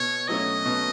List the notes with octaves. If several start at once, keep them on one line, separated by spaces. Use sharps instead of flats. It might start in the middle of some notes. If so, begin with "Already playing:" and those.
Already playing: B2 C#5
F#3 A3 C#4 D#5
B2